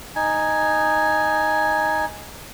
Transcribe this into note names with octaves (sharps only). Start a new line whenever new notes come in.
D#4 G#5